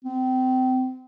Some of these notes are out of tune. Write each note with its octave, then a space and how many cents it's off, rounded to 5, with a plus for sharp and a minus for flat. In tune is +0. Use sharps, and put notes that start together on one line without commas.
C4 -30